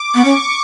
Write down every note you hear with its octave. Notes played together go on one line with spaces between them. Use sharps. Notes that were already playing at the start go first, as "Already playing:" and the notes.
Already playing: D6
C#6
B3
C#4